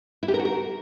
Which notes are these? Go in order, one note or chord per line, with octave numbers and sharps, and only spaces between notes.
E4
G4
A#4
F#4
A#4